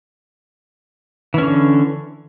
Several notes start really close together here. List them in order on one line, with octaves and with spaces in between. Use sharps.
E3 C#4 D3